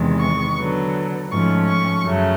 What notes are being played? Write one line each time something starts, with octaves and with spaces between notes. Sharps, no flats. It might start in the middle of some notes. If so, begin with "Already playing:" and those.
Already playing: E2 C3 D#3 G#3
C#6
D3 F#3 B3
G#2 F3 A3 C#4 C#6
C#6
F#2 C#3 F#3 A3